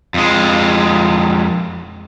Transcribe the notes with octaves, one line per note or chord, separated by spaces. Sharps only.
F2 G#3